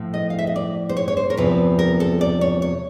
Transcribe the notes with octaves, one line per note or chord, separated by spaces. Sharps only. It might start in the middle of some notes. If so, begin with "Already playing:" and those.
Already playing: A2 F3 A3
D#5
F5
E5
D#5
D5
C5
C#5
C#5
C5
A#4
E2 C3 F3 B4
A#4
A4
D5
C#5
C#5